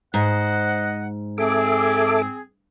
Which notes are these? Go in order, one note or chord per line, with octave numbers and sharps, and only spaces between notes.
G#2 C5 D#5 F#5
C4 G#4 A4 E5 D6